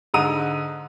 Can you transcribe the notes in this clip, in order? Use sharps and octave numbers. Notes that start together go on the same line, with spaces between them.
G#2 D3 A#5 D#6 D#7